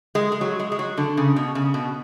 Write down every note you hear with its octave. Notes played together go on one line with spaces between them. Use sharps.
G#3
G#3
F#3
G#3
G#3
F#3
D3
C#3
B2
C#3
B2